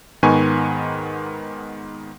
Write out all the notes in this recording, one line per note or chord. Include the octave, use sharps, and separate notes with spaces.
G#2 D#3 B3 G#5 C#6